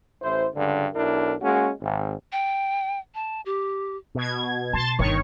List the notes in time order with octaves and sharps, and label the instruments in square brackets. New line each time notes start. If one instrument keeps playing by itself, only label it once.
[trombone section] A1 E4 C5
C#2 G2 D3
B1 D4 E4 A#4
G#3 A#3 C#4 F#4
G#1
[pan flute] G5
A5
G4
[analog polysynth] B2 G#6
[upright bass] B2 [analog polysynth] A5 C6 A6
[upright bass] G1 G3 [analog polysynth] D#3 C#5 C#6